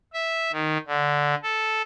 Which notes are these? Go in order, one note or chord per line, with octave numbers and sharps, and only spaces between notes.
E5
D#3
D3
A4